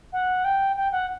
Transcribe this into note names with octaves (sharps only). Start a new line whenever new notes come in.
F#5
G5
G5
F#5